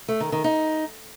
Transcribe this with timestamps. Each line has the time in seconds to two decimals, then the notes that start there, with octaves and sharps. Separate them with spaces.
0.08 A3
0.20 D#3
0.32 D#3
0.44 D#4